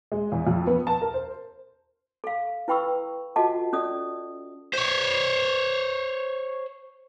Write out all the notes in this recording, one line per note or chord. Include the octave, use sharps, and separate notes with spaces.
G#3
E2
F2
B3
A5
A#4
C5
A4 F5
E4 B4 G5 B5 C#6 E6
F4 F#4 A4 D#5 F#5 A5
C#4 A4 D5 D#5 D#6
C5 C#5